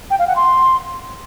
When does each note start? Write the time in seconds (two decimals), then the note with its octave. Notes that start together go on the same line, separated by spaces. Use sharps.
0.10 G5
0.19 F5
0.27 F#5
0.36 C6